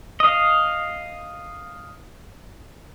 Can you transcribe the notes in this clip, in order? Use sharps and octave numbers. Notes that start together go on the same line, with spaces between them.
D#5 F5